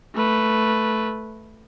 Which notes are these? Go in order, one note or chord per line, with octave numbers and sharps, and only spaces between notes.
A3 B4